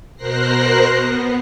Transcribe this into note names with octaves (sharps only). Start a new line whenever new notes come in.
B2 A#4 C5 F#6 A#6 C7
B3